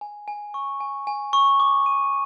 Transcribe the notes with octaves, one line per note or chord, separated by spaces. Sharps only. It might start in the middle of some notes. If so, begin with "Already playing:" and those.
G#5
G#5
C#6
G#5
G#5
C#6
D6
D#7